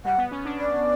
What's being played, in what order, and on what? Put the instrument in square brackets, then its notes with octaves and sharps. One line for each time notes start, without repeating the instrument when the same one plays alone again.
[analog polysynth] G3 [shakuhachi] F#5
[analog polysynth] B3
C#4
D4
[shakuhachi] D5